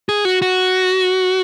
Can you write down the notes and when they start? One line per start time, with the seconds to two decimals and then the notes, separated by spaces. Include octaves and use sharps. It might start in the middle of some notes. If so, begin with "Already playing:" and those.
0.09 G#4
0.25 F#4
0.42 F#4